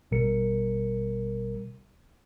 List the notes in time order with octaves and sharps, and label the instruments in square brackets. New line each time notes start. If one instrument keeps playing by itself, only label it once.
[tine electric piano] A1 B2 G3 A#4 C#7